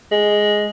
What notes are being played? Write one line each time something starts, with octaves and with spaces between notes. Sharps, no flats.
G#3